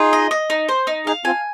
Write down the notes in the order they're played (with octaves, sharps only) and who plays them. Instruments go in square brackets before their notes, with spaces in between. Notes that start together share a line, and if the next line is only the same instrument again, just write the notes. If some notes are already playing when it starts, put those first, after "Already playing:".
Already playing: [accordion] D#4 G#4 [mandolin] F4
[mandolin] D#5
D#5
D#4
C5
D#4
[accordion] D#4 G#4 [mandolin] F5
[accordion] C4 F4 [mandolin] G#5